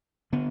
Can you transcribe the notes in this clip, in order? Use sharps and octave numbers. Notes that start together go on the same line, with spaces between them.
D3 B3